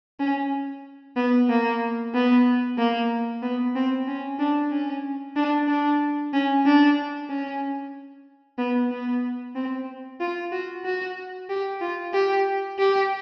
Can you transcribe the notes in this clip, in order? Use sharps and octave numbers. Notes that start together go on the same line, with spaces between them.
C#4
B3
A#3
B3
A#3
B3
C4
C#4
D4
C#4
D4
D4
C#4
D4
C#4
B3
B3
C4
F4
F#4
F#4
G4
F4
G4
G4